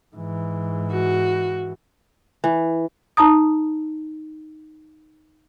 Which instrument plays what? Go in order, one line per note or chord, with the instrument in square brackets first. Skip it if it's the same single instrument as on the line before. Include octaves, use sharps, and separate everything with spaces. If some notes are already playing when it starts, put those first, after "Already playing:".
[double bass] G#2 E3
[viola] F#4
[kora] E3
[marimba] D#4 A5 A#5 D#6